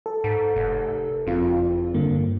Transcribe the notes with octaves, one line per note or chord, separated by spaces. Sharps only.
A4
G#2
F1
F#1 F2 C4 F4
G2 D3 A#3